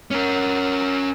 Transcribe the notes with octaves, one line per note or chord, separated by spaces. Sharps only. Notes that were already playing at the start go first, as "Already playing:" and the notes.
C#4 A#4